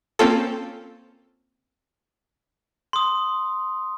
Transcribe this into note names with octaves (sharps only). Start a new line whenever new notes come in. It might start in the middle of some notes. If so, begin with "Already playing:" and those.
A#3 C4 C#4 F4 A4
C6 D#6